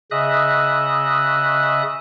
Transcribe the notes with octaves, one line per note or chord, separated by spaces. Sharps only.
C#3 D#5 E5 D#6 F#6